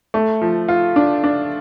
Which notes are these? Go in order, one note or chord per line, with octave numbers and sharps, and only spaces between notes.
A3
F3
F4
D4
D4